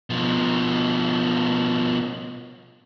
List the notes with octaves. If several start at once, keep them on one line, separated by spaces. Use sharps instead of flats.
B2 F3